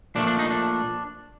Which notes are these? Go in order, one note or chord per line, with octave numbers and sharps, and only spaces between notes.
A#2 F3 A3 D4
D4
D#4
D4